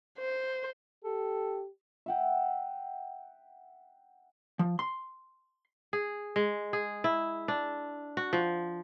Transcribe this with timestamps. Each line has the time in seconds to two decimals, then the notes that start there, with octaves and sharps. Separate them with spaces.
0.19 C5
1.05 G4 A4
2.06 E5 F#5 G5
4.59 F3
4.79 C6
5.93 G#4
6.36 G#3
6.73 G#4
7.04 E4
7.48 D4
8.17 F#4
8.33 F3